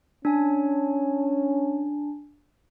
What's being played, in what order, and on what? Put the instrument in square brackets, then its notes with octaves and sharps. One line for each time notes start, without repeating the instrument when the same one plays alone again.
[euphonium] C#4 [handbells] D4 G#5